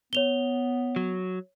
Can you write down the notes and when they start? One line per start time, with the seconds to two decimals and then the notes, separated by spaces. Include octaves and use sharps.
0.13 B3 C#5 F7 G7
0.96 F#3